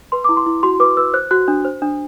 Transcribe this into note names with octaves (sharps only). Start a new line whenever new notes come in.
B4 C6
E4 D6
C6
E4
F#4 C6
B4 D6
B4 E6
C5 F#6
F#4 F#6
D4
C5
D4